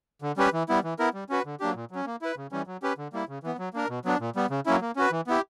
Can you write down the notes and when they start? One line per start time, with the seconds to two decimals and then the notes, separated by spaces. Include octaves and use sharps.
0.22 D3
0.37 G3 C#4 G4 B4
0.53 E3
0.69 G3 B3 E4
0.84 E3
0.99 B3 E4 A#4
1.14 G3
1.30 C#4 F#4 B4
1.45 D3
1.60 F#3 A#3 D4 G4
1.75 A#2
1.91 F#3 C#4
2.06 A#3
2.22 E4 B4
2.37 C#3
2.52 E3 G3 C#4
2.67 F#3
2.83 C#4 G4 B4
2.98 D3
3.13 G3 A#3 E4
3.29 C#3
3.43 E3 B3
3.59 F#3
3.74 A#3 D4 A#4
3.89 B2
4.05 F#3 B3 D4
4.20 A#2
4.36 G3 B3
4.50 C#3
4.66 F#3 A#3 C#4 E4
4.81 A#3
4.96 C#4 F#4 B4
5.11 E3
5.27 B3 E4 G4